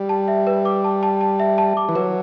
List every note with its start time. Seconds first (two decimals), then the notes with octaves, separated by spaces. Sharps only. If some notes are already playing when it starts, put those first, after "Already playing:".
Already playing: G3
0.09 A5
0.28 E5
0.47 B4
0.65 D6
0.84 A5
1.03 A5
1.21 A5
1.40 E5
1.58 A5
1.77 D6
1.89 E3
1.95 F#3 B4